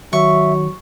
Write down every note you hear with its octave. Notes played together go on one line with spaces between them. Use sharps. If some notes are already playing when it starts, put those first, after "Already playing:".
D#3 F#3 E5 C#6